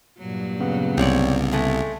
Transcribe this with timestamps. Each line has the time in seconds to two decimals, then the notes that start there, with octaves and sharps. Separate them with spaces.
0.18 G2 A#2 F#3
0.60 C#3 B3
0.97 C2 C4 C#5 D5
1.52 G#3 A3